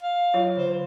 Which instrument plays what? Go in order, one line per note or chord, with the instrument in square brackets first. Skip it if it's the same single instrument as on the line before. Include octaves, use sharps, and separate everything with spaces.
[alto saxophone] F5
[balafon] F#3 F4 C#5
[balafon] D3 [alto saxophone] C5